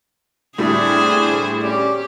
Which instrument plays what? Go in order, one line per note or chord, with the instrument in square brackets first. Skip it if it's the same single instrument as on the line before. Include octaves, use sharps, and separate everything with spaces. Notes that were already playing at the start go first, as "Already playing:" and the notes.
[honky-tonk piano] A2 D3 G3 [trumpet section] C4 D4 [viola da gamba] G#4 C5
[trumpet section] C#4 D5 [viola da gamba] G4